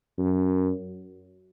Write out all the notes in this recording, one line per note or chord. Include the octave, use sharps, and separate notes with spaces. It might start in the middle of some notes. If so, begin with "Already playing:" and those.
F#2